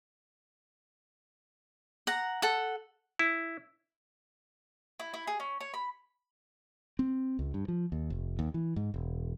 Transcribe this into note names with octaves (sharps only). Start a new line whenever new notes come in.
F#5 A#5
A4 F#5
E4
E4
E4
G#4
C#4
C#5
B5
C4
C#2
G2
F3
D#2
F1
D#2
E3
G#2
E1